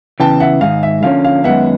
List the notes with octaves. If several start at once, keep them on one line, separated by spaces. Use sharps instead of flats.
E2 C#3 E3 G5 A5
E5 F#5
G#2 D#3 G#3 F5
E5
D3 F3 A#3 C#4 F5
F5
F#2 D#3 G#3 B3 E5 F#5